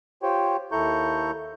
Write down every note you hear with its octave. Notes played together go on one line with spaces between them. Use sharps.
F4 G4 C5 C#5 G5
D#2 E4 A4 A#5 C#6 G6